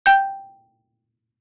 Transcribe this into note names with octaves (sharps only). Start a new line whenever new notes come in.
G5 G6